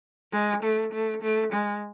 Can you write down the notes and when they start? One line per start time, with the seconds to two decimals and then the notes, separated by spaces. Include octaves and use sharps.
0.33 G#3
0.63 A3
0.93 A3
1.22 A3
1.52 G#3